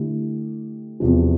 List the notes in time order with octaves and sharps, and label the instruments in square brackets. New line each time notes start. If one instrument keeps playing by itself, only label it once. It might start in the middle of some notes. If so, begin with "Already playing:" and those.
Already playing: [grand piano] D3 A3 E4 G4
E2 C3 F3